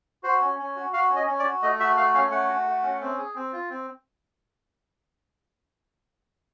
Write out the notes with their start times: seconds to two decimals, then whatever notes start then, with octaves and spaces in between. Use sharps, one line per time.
0.23 F#4 C5
0.41 C#4
0.59 C#4
0.76 F#4
0.93 F#4 F5
1.10 C#4
1.16 D#5
1.27 C#4
1.39 D5
1.44 F#4
1.62 A3 D#5
1.80 F#4 E5
1.97 A3 F5
2.14 C#4 F5
2.31 A3 F#5
2.49 F#4
2.67 A3
2.83 C#4
3.01 C4
3.18 G#4
3.35 C4
3.53 F4
3.70 C4